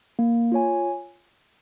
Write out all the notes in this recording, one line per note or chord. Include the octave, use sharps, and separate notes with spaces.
A#3
F4 C#5 G#5